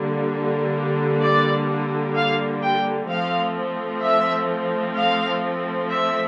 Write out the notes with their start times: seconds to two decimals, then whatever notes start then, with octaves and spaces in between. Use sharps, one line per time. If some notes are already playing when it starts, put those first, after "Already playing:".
Already playing: D3 G3 A#3
1.22 D5
2.16 F5
2.62 G5
3.09 F3 A3 C4 F5
4.03 E5
4.96 F5
5.90 E5